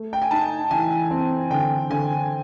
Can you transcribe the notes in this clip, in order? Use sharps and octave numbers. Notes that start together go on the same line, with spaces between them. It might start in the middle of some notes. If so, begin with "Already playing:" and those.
Already playing: A3
G5
G#5
D#4 A5
E3 G#5
C4
D3 G5
D3 G#5